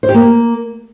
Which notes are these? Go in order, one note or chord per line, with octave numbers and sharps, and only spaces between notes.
C5
G4
A#3